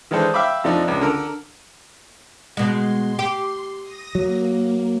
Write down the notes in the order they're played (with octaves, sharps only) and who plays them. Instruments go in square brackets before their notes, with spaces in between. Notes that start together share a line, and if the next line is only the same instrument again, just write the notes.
[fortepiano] D#3 E3 G#3 D4 A4 C5
E5 F5 G5 B5 D6
F2 F3 D4 D#4
C#2 D4
D3 A#4
[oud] B2 G#3 [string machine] C6
[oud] G4
[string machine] D#6 A#6
[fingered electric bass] F#3 [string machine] A#3